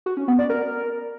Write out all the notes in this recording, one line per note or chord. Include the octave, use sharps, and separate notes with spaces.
F#4
C#4
B3
D5
A#4